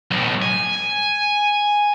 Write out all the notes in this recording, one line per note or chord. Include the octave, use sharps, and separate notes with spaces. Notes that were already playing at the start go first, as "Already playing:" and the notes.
B1 A2
G#5